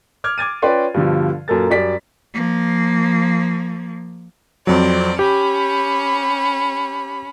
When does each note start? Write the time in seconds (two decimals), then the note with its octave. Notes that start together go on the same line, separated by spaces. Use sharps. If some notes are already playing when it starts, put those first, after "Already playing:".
0.24 D6 F6 G#6
0.38 D6 G#6 A6 D#7
0.62 C#4 F4 B4 D5 G5 C6
0.94 G2 B2 D3 F3
1.48 F#2 A#2 A4 A#4 A6
1.70 F#2 G3 D5 B6
2.34 F3 A#3
4.67 F2 F#3 C4 D5
5.19 C#4 G4 B5